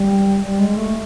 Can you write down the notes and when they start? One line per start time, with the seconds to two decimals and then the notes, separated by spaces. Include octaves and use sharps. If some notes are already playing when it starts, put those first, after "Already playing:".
Already playing: G3
0.41 G3
0.59 G#3
0.76 A3